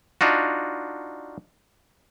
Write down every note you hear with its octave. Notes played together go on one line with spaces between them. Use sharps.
D4 D#4 F4 F#4